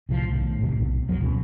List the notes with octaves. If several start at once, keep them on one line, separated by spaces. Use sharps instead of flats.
C2 A2 F3
B1 A2 D#3
D#1 A1 F2 C3
B1
E2 A2 F3 F#3
C#2 B2 G3 C#4